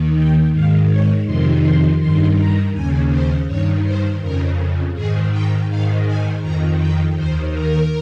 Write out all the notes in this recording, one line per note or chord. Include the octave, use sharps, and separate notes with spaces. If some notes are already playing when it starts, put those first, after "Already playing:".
Already playing: D#2 D#3
G5
G#2 D#3 F5
C#5
F2 C3 D#3 C6
C6
G2 D#3 C6
A#5
D#2 C#3 G#5
C5
G2 D#3 C#5
C5
F2 C#3 A#4
G#2 D#3 G#4
G5
G#2 D#3 F5
G#5
F2 D#3 A#5
G5
D#2 D#3 C5
A#4